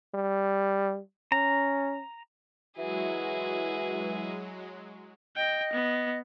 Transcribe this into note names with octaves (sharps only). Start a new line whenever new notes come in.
G3
C#4 A#5
E3 F#3 G#3 E4 F#4 G#4
D#5 G5
B3